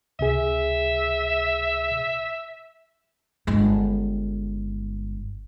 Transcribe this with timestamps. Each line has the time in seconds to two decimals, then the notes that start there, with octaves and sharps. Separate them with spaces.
0.19 C#2 C3 G#4 E5
3.47 G1 G#3